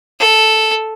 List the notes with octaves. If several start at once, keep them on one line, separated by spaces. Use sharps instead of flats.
A4